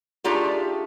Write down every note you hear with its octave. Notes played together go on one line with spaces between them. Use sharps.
A3 D4 D#4 F4 G4 G#4